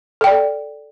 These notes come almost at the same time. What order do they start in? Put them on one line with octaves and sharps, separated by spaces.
A4 G5 D5